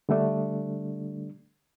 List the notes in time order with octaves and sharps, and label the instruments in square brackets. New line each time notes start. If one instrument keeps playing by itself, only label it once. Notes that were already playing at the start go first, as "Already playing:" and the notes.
[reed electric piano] D3 G3 A3 D4